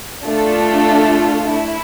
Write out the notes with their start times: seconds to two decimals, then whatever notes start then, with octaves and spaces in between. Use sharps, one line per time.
0.24 A3 D4 F4 A4
1.53 E4